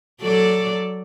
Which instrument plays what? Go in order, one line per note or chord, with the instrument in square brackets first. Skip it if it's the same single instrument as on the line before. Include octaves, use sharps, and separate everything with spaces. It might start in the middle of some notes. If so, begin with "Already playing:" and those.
[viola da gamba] F#3 A4 D5